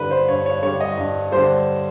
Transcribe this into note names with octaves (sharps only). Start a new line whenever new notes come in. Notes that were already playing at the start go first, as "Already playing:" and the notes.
Already playing: G2 D3 G3 B4
C5
G2 C#5
C#5
D3 G3 C#5
D#5
G2
D3 G3 C5